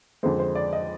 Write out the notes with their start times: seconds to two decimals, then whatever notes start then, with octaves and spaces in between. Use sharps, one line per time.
0.23 F2 D3 G#3 C5
0.39 C5
0.55 D5
0.73 D#5